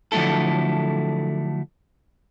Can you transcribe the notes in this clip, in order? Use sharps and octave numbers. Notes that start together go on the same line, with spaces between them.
D3 F3 F#3 A3 E4 A4